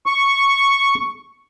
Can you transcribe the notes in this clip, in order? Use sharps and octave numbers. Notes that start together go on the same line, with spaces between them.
C#6